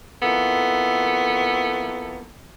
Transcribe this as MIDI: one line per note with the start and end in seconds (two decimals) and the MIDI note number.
0.23 2.26 41
0.23 2.26 58
0.23 2.26 59
0.23 2.26 64
0.23 2.26 69